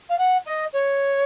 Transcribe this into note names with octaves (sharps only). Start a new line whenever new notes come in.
F5
F#5
D#5
C#5